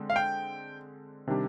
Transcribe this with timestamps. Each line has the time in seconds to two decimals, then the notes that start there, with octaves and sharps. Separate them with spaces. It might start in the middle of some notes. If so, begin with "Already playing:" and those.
Already playing: D3 G#3 C4
0.10 F5
0.16 G5
1.28 C3 D#3 G3 D4 G4